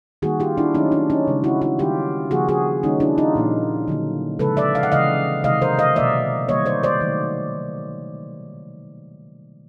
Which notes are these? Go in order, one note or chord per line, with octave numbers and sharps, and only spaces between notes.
D#3 G3 A#3 F#4 G#4
F4 G4
D4 E4
D#3 F#3 A3 C#4 D#4
D4 E4
C#4 D#4
C#3 E3 G#3
E4 F#4
E4 F#4
D#3 G3 A#3 F4 G4
C#3 F3 A#3 F#4 G#4
F#4 G#4
D#3 G3 A#3 C#4 D#4
D4 E4
D#4 F4
A#2 F3 A#3
D3 F#3 A#3
C#3 F3 G#3 A4 B4
D5 E5
F5
F#5
C#3 E3 G#3 D#5 F5
C3 D#3 G#3 D#5 F5
A#4 C5
D#5 F5
B2 F#3 A#3 D5 E5
D#3 G3 A#3 C#5 D#5
C5 D5
C5 D5
D#3 F#3 A3